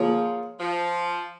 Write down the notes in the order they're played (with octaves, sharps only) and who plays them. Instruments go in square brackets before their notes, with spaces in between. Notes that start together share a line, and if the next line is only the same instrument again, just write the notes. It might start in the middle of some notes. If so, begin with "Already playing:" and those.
Already playing: [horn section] F3 [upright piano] A#3 F4 G#4 C#5
[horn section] F3